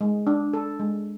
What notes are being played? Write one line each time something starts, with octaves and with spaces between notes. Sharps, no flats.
G#3
D4
A4
G#3